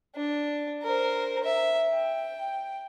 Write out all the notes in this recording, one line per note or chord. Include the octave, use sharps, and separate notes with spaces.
D4
A#4 C5
E5
G5